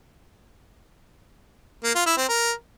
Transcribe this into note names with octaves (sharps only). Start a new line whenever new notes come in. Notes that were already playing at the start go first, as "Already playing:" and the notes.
A#3
F4
E4
C4
A#4